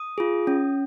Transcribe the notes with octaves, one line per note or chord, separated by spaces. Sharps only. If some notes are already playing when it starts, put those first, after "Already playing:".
Already playing: D#6
F4 G#4
C#4